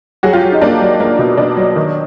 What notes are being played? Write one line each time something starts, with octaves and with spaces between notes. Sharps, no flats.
F#3 F#4 G#4
F4 G4
F#3
D#4
A#3 D4
F#3
A#3
B2
B2 D4
F#3
D#3